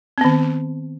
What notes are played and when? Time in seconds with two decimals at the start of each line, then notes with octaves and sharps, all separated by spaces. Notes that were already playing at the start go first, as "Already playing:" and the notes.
0.18 C4
0.21 B3
0.25 D#3